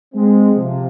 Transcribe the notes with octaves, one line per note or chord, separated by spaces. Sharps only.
G#3 C4
C3 F3